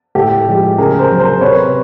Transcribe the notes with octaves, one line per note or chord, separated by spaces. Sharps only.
A2 G4 A4
F3 G#3
C#3 G#4 A#4
A#4 C5
F#3
A#4 C5
C3 B4 C#5